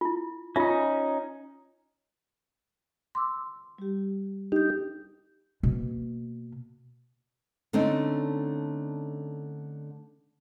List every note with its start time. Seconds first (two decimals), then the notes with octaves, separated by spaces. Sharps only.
0.01 E4 F4
0.56 C#4 D#4 F4 E5
3.15 C6 D6 E6
3.78 G3 G4
4.52 D4 D#4 G4 G6
5.63 B2 A#3
7.73 D3 A3 C4 C#4 D#4